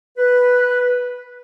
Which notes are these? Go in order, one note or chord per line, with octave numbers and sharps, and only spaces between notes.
B4